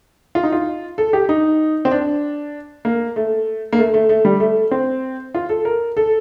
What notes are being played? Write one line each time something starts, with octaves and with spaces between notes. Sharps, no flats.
F4
D#4
F4
A4
G4
D#4
C4
D4
A#3
A3
A#3
A3
A3
A3
G3
A3
C4
F4
A4
A#4
A4